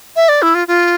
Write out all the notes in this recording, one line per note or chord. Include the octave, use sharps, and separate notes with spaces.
E5
D5
E4
F4
F4